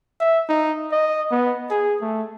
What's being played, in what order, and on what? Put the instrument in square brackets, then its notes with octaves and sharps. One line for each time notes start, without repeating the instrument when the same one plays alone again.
[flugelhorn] E5
D#4
D#5
B3
G#4
A3